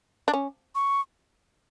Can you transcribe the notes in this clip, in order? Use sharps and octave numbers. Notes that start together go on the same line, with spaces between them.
D4
C#4
C#6